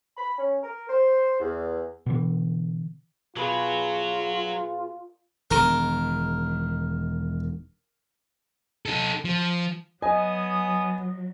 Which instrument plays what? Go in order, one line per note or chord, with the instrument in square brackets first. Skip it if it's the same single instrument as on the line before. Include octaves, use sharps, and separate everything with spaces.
[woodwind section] B5
C#4
A#4
C5
E2
[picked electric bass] B2 D3 E3
[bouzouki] B2 G#4 B4 [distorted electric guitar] F#3 [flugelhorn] F4
[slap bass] E1 D#3 [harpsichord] A#4
[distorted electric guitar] D#4 A4
F3
[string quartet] F#3 [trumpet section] B3 D#6 [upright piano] D#5 G#5